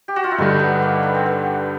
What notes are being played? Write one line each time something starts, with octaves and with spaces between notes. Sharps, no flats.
G4
F#4
F4
E4
G2 D3 G3 D#4
B3
A#3
B3
C4
B3